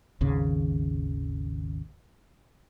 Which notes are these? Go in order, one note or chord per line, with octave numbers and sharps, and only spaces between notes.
G#1 D#2 C#3